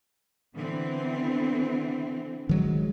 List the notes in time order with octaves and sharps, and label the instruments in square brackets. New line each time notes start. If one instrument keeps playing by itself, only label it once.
[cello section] D3 E3 C4
[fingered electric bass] D#3 F#3 G#3